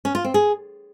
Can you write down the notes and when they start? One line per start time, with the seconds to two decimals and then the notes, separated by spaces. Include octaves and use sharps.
0.05 C#4
0.15 F4
0.24 C4
0.34 G#4